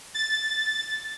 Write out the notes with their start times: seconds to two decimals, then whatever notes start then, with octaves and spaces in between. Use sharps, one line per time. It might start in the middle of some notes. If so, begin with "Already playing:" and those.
0.14 A6